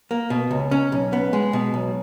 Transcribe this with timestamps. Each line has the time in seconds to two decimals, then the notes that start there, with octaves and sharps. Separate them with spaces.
0.11 A#3
0.30 B2
0.51 C#2
0.71 C#4
0.92 B1
1.13 B3
1.33 G#3
1.53 B2
1.74 B1